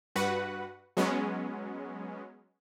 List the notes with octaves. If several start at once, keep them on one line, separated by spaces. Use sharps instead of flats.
G2 F#4 B4 F#5
F#3 G#3 B3 C#4